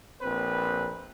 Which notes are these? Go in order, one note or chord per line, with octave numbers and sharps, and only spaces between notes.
A#1 C4 B4 C5